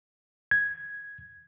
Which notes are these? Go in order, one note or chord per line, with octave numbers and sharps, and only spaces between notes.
G#6